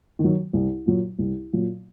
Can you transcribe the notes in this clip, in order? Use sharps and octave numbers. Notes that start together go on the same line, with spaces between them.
D#3
F#3
C2
A#2 F#3
C2
A#2 F#3